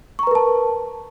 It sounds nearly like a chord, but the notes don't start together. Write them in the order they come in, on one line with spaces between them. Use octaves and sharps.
C#6 A#5 B4 A#4 A5